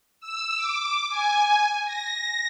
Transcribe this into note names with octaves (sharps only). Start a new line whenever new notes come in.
E6
D6
G#5
A#6